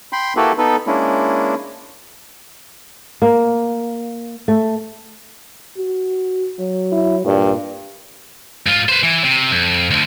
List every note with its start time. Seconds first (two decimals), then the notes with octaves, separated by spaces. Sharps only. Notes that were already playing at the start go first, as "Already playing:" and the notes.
0.13 G5 B5 C6
0.37 A#3 E4 F#4 G4 A4 B4
0.58 B3 D#4 A4 B4
0.87 G#3 A#3 C#4 D4 E4
3.22 A#3
4.48 A3
5.77 F#4
6.59 F#3
6.92 E4
7.25 G2 A#2
8.67 G#2 F4
8.89 B4 C5
9.02 E3
9.24 C3
9.51 F2
9.91 D2 D3